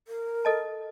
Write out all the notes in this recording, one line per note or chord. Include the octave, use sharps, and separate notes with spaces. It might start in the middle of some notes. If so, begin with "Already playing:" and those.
A#4
A4 D#5 A5